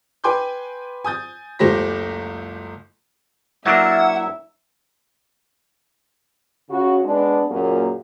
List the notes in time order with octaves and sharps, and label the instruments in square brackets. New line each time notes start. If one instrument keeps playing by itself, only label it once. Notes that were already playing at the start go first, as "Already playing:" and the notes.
[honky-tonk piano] B4 G5 G#5 C6 D6 G6
G#5 D#6 G6 A6
F#1 C#2 A3 G4 C5 A#6
[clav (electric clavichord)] F#3 A#3 D4 [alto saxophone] E4 [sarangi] E5 [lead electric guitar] F#5
[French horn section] C#3 F#4
G#3 B3 D4
F#2 A#2 F#3 A#3 G#4